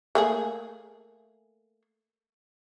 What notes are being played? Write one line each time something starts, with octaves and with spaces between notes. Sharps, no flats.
A3 A#3 G#4